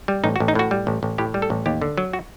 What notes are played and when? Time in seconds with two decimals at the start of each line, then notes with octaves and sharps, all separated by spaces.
0.08 G3
0.24 A1 D#4
0.36 F#4
0.40 A1
0.48 D#4
0.55 A2 F#4
0.71 G3
0.87 A1
1.03 A1
1.18 A2 G4
1.34 G3
1.42 A4
1.50 A1
1.66 D#2 G4
1.82 D3
1.98 F#3
2.13 F#4